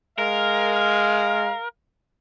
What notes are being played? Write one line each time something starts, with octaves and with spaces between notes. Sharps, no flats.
G#3 A#4 F5